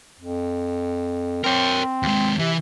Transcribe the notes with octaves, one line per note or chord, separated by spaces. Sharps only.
F2
C4 A#4 C#5
D#2 G#3
C3 E3